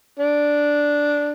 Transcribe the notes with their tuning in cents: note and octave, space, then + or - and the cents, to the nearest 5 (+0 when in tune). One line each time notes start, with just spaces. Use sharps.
D4 -5